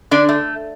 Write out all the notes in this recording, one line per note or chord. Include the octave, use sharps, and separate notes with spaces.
D3 D4
A3